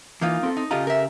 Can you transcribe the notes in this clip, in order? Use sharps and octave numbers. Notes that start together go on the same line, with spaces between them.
E3 A#3 D#4 F4
C4 A4
D#4
C#3 F4 G4 A4 D#5 A#5
A#4 E5